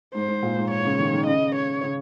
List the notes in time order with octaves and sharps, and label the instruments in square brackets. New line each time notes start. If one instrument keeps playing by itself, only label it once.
[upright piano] G#2 [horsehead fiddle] C5
[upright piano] G#2
A#2
G#2
[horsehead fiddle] C#5
[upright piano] C#3
D#3
D#3
[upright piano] C#3 [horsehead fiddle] D#5
[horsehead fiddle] C#5
[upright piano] C#3